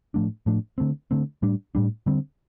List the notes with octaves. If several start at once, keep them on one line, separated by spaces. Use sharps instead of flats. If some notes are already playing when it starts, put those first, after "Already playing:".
A2 F3 A3 D4
A2 F3 A3 D4
D3 A3 C4
D3 A3 C4
A2 G3 D4
A2 G3 D4
D3 G3 C4